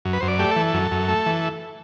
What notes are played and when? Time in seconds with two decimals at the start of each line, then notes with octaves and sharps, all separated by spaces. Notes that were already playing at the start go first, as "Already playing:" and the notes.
0.05 F#2
0.13 B4
0.20 F#2 C5
0.28 D5
0.39 A3 G4
0.51 E3 A4
0.74 F#2
0.91 F#2
1.08 A3
1.26 E3